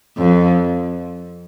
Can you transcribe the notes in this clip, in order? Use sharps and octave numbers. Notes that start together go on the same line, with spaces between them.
F2